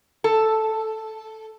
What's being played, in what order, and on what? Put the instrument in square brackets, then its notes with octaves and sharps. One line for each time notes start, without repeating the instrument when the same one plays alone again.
[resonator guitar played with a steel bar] A4